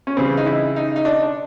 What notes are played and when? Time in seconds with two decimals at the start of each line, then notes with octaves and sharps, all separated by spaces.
0.07 C#4
0.17 C#3 E3 G3 C4
0.37 D#4
0.46 E4
0.76 D#4
0.96 D#4
1.05 D4
1.23 D4